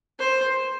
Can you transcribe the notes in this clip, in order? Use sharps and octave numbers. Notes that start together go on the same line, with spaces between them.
C5